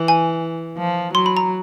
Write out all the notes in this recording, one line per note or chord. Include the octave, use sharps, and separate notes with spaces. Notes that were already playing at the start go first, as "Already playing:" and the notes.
Already playing: E3
G#5
F3
F#3 C6
B5
A#5